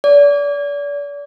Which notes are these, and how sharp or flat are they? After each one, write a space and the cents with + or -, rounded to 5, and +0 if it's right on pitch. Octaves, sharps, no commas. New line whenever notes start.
D5 -35